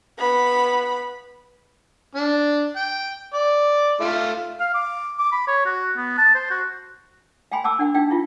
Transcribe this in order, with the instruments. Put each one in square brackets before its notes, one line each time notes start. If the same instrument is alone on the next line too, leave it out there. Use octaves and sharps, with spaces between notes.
[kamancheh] B3 B5
[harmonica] D4
G5
D5
A3 F4
[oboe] F5
D6
D6
B5
C#5
F#4
B3
A5
C5
F#4
[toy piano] F5 G5 G#5 B5 C6
F#5 A5 D6 E6
D4 F#5
D4 D#4 F5 G5
E4 F4 F5